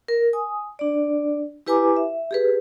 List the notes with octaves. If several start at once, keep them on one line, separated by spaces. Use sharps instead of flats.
A#4
G#5 D#6
D4 D5
E4 G4 B4 G#5 A#5 D6
E5
G4 G#4 B4